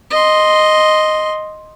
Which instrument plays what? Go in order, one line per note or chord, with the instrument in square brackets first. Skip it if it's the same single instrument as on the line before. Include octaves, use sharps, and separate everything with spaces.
[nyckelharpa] D#5 C6